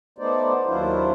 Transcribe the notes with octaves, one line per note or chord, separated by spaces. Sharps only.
A3 B3 D#4 C5 D5
D#2 F#3 D4 E4 F4 C5